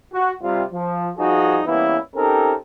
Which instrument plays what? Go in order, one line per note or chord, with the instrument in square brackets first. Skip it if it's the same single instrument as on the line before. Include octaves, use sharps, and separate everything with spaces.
[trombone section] F#4
C3 G3 F4
F3
F3 G3 D#4 F#4 G#4
E3 G3 A#3 B3 C#4 E4
C4 C#4 D#4 G4 A4 A#4